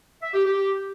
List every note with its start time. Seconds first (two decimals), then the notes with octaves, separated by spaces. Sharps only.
0.22 E5
0.34 G4
0.45 G4